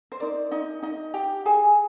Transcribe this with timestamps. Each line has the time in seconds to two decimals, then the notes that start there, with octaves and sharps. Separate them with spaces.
0.12 C5
0.20 D#4 A#4 D5
0.51 D#4 D#5
0.82 D#4 D#5
1.14 G4 G5
1.46 G#4 G#5